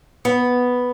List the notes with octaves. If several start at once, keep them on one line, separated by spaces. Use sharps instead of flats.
B3